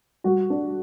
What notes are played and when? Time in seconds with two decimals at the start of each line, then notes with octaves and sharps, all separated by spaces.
0.24 G3 F#4
0.50 D4